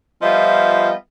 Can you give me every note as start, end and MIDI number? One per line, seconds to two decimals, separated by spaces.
0.22 0.92 53
0.22 0.92 55
0.22 0.92 59
0.22 0.92 65
0.22 0.92 75
0.22 0.92 76